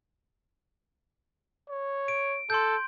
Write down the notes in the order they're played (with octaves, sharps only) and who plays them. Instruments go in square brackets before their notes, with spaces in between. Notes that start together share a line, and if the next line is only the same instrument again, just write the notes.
[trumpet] C#5
[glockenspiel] D7
[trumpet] A4 [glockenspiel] C6 G6